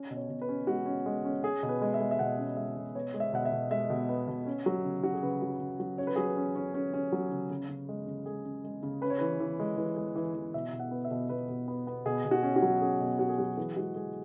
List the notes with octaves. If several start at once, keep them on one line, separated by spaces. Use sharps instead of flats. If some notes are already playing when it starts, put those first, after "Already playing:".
Already playing: C#4
B2
C#5
B2
B4
C#4
G#3 F#4
C#4
G#3
C#4
C#4 G#4
B2
B4
G#3
E5
G#3
E5
B2 F#5
C#4
G#3 E5
B2
B3 C#5
G#3
E5
B2 F#5
E5
B2
G#3 E5
B2
B3
B2
C#4
F#3
C#3
C#4 F#4
G#4
C#3 B4
F#3
C#3
F#3
C#4 C#5
B4
F#3 G#4
B4
C#4
C#4
C#4
C#4
F#3
C#3
C#3
C#3
G#3
C#3
G#3 G#4
C#3
G#3
C#3
C#4 B4
C#5
E3 B4
E3
G#3
E3
G#3
E3
E3
B2 E5
B2
F#5
B3
E5
B2
B2 B4
B2
B3
B3
B2 G#4
B2
F#4
C#4
F#4
F#3
C#4 G#4
B2
B2 F#4
G#4
F#3 F#4
E3 G#4
G#3 F#4
G#3 G#4